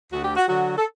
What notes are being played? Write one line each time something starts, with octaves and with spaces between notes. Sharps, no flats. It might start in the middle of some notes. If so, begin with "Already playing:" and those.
D2 F#4
G4
F#4
D3 F#3 F#4
A4